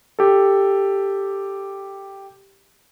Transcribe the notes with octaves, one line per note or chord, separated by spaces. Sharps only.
G4 A4